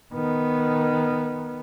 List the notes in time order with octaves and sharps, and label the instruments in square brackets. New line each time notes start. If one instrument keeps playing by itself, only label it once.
[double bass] D#3 B3